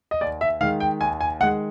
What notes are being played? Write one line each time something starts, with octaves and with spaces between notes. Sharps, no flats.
D#5
D#2 D5
E5
D#3 G#3 F5
G5
D#2 G#5
G#5
D#3 G#3 F#5